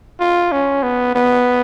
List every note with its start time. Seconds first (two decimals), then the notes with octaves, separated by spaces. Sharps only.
0.20 F4
0.52 C#4
0.83 B3
1.15 B3